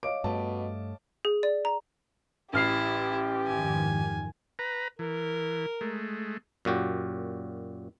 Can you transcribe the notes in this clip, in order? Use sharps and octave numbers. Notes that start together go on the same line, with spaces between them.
C#5 D#5 F5 D6 D7
G2 B2 A3 A5
G#4
D5
A#5
A1 E4 G4 F6 C7
F2 G#2 D#3 G#5
B4 A#5
E3 A#4
G#3 A3
F#2 A#2 F#4 G4